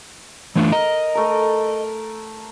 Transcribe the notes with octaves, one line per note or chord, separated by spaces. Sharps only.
E3 A3 D4
A#4 D#5
A3 A#4